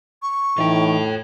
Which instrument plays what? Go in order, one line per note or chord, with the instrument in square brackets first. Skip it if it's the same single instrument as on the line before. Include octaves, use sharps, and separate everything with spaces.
[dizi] C#6
[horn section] A2 [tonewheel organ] E3 D#4 [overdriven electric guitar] F4 G5